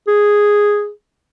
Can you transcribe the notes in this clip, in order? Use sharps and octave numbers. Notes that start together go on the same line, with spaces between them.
G#4